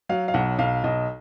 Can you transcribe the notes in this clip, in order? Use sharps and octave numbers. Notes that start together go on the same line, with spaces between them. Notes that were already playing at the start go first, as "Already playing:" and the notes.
F#3 F5
F5
B1 F#5
B1 F5
B1 D#5